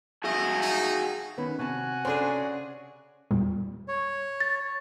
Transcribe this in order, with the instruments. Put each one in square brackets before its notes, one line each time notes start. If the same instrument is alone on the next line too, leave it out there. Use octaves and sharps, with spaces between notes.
[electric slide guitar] F#4 G#4 E5 [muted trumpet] D#5
[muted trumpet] D#4
[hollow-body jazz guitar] D#3 B3 C#4 [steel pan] B4
[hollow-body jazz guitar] C3 A5 [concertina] F#4 F#5 G#5
[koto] C#3 D4 G#4 [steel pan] A4 C5
[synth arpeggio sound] E2 A#2 G3
[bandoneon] C#5
[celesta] A6